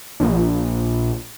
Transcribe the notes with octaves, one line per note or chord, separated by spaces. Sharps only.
A#1